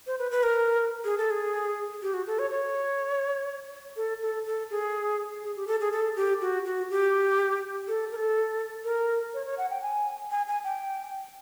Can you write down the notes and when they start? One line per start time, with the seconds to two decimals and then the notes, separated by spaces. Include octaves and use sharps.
0.07 C5
0.19 B4
0.31 B4
0.43 A#4
1.04 G#4
1.18 A4
1.30 G#4
2.02 G4
2.14 F#4
2.27 A4
2.39 C#5
2.51 C#5
3.97 A4
4.22 A4
4.46 A4
4.70 G#4
5.43 G#4
5.56 G4
5.67 A4
5.81 G#4
5.92 A4
6.16 G4
6.41 F#4
6.65 F#4
6.90 G4
7.88 A4
8.12 A#4
8.16 A4
8.84 A#4
9.34 C#5
9.46 C#5
9.58 F#5
9.70 G5
9.82 G#5
10.31 G#5
10.47 G#5
10.64 G5